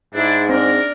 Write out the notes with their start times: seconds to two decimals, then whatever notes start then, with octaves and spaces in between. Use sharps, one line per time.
0.15 G#2 D4 E4
0.49 C4 D4 A#4